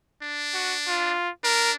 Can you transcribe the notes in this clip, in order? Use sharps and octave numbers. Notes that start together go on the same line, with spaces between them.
D4
F#4
F4
D4 A#4